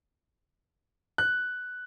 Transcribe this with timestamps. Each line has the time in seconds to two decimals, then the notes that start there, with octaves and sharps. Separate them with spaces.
1.18 F#6